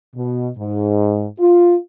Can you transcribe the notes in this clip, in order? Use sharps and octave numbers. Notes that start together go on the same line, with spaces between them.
B2
G#2
F4